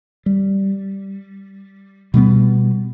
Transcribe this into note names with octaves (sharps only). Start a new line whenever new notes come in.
G3
B2 G3 A3 B3